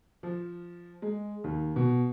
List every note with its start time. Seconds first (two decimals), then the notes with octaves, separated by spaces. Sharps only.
0.23 F3
1.02 G#3
1.44 D#2
1.76 B2